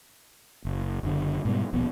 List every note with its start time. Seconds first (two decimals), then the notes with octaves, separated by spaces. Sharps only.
0.65 F#1
1.03 F#1 D3
1.45 G#2 B2 G3
1.73 D#1 A#1 B2 B3